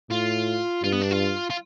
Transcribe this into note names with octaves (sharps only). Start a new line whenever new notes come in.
A2 F4
G2 F4
B3
D4
F4
F4